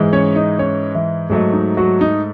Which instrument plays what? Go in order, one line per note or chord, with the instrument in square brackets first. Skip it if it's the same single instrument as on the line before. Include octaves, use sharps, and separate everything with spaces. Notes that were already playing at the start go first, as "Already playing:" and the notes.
Already playing: [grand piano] G#2 E3 G#3
C#4 C#5
D#4 D#5
C#4 C#5
E3 E4
G#2 F#3 A3
D#4
F#3 F#4
D#4